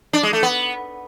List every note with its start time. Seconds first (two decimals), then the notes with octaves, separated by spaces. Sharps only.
0.13 D4
0.23 G#3
0.33 A3
0.43 B3